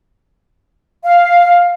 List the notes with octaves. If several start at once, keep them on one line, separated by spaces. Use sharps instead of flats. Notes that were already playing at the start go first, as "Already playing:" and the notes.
F5